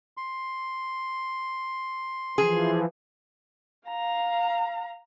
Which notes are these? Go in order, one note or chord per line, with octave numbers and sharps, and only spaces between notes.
C6
E3 F3 G#4
F5 A#5